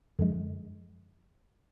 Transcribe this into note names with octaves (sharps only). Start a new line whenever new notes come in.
F#2 D3 F3 G#3